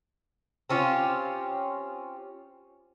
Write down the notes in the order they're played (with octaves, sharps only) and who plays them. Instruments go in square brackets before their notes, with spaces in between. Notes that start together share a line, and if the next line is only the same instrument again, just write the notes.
[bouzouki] C4 C#4 F4 G4